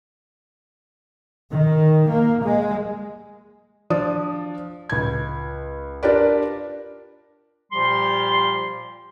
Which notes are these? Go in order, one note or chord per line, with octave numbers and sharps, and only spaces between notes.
D#3
A#3
G#3
F3 D4 D#6
C#2 G#6
D4 F4 G4 A#4 B4 D5
A#2 F3 G3 G4 C6